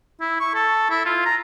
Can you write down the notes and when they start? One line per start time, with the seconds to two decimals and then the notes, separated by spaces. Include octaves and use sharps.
0.21 E4
0.40 C#6
0.55 A4
0.90 E4
1.06 F4
1.25 A#5